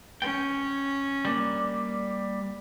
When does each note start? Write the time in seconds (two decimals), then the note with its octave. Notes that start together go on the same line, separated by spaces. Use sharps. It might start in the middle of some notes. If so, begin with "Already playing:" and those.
0.22 C#4 G5
1.25 G3 A#3 D4